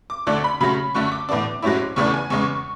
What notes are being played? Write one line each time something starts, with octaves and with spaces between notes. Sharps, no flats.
D6
D2 D3 A3 D4 D6
B5
C#3 F#3 A3 C#4 B5
F#2 D3 A3 C#6
D6
A2 E3 B3 D4 D6
G#2 F#3 A3 C#4 E4
E2 C#3 E3 A3 D4 C#6
G#5
E2 C#3 G#3 C#6